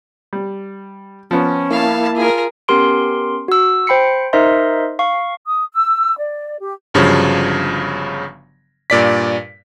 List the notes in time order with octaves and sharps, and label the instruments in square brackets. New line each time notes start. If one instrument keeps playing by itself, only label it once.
[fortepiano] G3
[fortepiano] F3 B3 [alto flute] C#4
[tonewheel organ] A#3 E4 [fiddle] F5 A5
[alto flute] F4 [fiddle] G#4 A#4
[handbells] B3 C#4 G4 A#4 C6 D7
F#4 E6
C5 G5 B5 C7 C#7
D#4 A#4 C5 D#5 E5 C6
F5 C#6
[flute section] D#6
E6
D5
G4
[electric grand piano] G1 G2 C#3 F3 F#3
G2 A#2 D5 B6